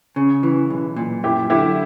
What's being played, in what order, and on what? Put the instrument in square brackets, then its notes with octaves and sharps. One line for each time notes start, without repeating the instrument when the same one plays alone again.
[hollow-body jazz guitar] C#3
E3
B1
A#2
[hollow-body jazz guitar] F#2 [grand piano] E4 G4
[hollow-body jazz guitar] D3 [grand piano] E4 G4